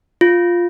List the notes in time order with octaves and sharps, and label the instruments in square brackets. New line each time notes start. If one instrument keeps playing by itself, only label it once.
[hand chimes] F4